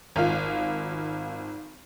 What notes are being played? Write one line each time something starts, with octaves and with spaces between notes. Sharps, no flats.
G#1 F4 F5